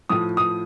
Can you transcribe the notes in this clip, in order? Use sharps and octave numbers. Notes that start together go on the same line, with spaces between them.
A2 F3 D#6
D#6